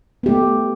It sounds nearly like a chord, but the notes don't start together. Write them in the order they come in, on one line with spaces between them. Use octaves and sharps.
B3 G4 A3